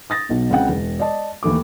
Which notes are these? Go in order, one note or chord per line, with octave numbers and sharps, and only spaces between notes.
D#6 A6 A#6
B1 B2
C#2 C#3 C4 F#5 G5
E1
D5 D#5 A5
D#2 E3 A3 D6